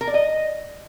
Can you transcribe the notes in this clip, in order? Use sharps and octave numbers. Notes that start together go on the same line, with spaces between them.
A#4
D5
D#5